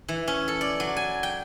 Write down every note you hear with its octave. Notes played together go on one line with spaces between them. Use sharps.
E3
C#4
A4
D5
F#3
G#5
G5